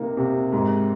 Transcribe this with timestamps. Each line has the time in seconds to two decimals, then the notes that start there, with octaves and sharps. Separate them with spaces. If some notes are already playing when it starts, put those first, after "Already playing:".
Already playing: C3 A#3 D#4
0.17 C3
0.53 G#2